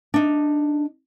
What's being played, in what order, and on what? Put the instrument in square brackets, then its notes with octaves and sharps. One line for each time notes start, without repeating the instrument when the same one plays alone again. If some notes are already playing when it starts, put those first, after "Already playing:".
[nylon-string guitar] D4 D#4